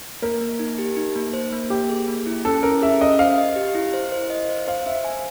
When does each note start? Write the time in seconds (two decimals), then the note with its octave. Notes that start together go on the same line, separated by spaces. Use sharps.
0.22 A#3 A#4
0.41 A#3
0.59 D#4
0.79 G4
0.96 D#4
1.15 A#3
1.33 C5
1.52 A#3
1.70 A#3 G4
1.89 G#4
2.08 A#3
2.26 E4
2.45 C#4 A4
2.63 C#4 A#4
2.82 G#4 E5
3.01 C#4 D#5
3.19 C5 F5
3.38 D#5
3.56 G4
3.75 E4
3.93 C5
4.12 C5
4.30 D#5
4.49 C5
4.67 C5 F5
4.86 C5 E5
5.05 G#5